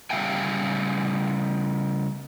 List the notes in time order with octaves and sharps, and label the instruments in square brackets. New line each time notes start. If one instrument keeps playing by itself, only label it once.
[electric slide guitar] C#3 G3 E5 F5 G5 G#5